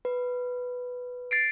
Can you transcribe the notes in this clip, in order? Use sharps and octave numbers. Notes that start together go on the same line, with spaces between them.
B4
A6 C7 D7